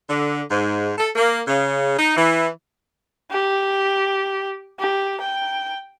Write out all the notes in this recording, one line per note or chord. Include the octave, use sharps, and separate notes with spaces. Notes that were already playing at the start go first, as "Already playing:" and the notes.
D3
G#2
A4
A#3
C#3
D#4
E3
G4
G4
G5